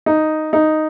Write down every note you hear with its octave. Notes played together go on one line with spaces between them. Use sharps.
D#4
D#4